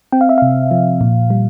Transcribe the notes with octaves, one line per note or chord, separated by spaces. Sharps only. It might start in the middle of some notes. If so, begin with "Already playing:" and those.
C4 G5
F5
E5
C3 F5
F3
A#2
G3